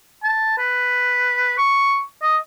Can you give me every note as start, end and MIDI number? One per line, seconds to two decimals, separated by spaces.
0.23 0.57 81
0.58 1.53 71
1.58 2.02 85
2.22 2.37 75